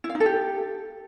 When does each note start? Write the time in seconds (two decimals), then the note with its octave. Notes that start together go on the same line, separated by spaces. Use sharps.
0.04 E4
0.09 F5
0.15 D#4
0.20 A4
0.26 G4